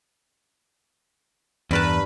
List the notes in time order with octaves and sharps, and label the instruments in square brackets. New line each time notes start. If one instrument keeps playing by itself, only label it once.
[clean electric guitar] E2 [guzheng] G2 A#4 A5 [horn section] B4